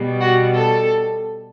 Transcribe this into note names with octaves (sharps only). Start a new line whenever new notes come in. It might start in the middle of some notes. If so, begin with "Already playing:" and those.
Already playing: B2 G3
F#4
A4